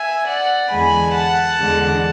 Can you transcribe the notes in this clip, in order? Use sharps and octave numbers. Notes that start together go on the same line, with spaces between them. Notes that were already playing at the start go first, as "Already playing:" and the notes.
Already playing: E5 G#5
D5 F#5
E2 D3 G#3 G#5 B5
F#5 A5
E2 D3 G#3